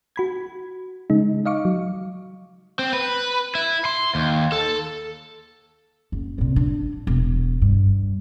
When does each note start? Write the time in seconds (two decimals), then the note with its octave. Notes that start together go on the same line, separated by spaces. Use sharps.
0.16 F#4 B5 G#6
1.10 C#3 G#3 D#4
1.46 D#5 F5 C#6 D6
1.65 F#3
2.79 C4
2.93 B4
3.55 E4
3.85 C6
4.15 D#2
4.52 A4
6.12 F#1
6.38 C2 A#2
6.56 D4
7.07 E1
7.62 G2